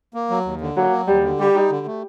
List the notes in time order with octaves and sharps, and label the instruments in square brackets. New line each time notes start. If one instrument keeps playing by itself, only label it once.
[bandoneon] A#3
F#3
D#2
D3
[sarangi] F#3 [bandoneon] A#3
[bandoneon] F#3
[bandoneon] D#2 [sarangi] G3
[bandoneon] D3
[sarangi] G3 [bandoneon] G4
[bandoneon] D#4
D3
A3